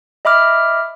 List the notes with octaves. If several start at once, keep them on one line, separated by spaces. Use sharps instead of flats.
D#5 E5 B5 D6 F6